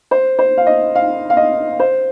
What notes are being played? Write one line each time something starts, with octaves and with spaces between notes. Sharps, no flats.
C5
C5
F5
D#5
F5
F5
D#5
C5